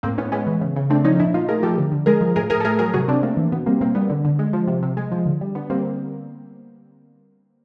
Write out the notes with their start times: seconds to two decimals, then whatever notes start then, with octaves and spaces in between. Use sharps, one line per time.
0.03 A2 A#3 C4
0.18 A2 B3 C#4
0.32 G#3 B3 C#4
0.47 E3
0.61 C#3
0.76 C#3
0.90 A3 C4 D4
1.04 F3 C#4 D#4
1.19 A#2 D4 E4
1.34 A#2 D#4 F4
1.49 A3 G#4 A#4
1.63 F3 G4 A4
1.78 D3
1.92 D3
2.06 G#3 G#4 A#4
2.21 F3
2.36 A2 G#4 A#4
2.50 A2 G#4 A#4
2.60 A4
2.65 A3 G#4 A#4
2.79 F#3 G#4 A#4
2.94 C3 F#4 G#4
3.08 C3 C4 D4
3.23 A3 A#3 C4
3.37 E3
3.52 B2 B3
3.66 G3 A#3 C4
3.81 B2 A#3 C4
3.95 G3 B3
4.10 D3
4.25 D3
4.39 G#3
4.53 F3
4.68 C3
4.82 C3
4.97 G#3
5.12 F3
5.26 D3
5.41 G3
5.55 D3 B3
5.70 G3 A#3 C4